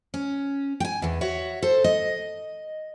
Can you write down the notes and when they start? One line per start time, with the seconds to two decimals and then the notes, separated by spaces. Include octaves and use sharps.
0.14 C#4
0.80 G5 G#5
1.02 E2 E3
1.21 F#4 C#5 E5
1.62 A4 C5
1.84 D#5